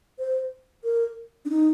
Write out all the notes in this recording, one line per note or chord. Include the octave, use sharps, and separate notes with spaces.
C5
A#4
D4
D#4